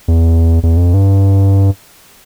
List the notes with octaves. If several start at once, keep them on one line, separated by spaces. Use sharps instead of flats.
E2
E2
F2
G2